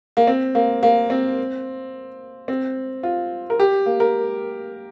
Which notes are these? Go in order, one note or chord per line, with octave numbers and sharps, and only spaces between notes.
A#3
C4
A#3
A#3
C4
C4
F4
A#4
G4
A#3
A#4